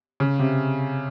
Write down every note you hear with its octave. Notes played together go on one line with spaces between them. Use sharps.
C#3
C3